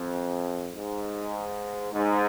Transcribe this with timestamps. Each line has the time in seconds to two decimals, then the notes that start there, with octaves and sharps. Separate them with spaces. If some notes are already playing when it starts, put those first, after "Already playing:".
Already playing: F2
0.71 G#2
1.94 G#2